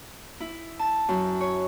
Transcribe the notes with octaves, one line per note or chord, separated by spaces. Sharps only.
E4
A5
F#2
C#5